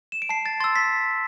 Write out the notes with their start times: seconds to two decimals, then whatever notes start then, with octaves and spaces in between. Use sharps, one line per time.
0.12 E7
0.22 D7
0.29 A5 C7
0.46 A6
0.60 C6 E6 A6
0.76 B6